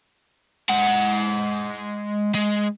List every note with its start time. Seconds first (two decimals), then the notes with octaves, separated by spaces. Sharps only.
0.69 G#3 F#5
2.35 G#3